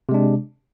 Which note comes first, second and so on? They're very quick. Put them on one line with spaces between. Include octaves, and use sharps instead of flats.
C3 G#3 D4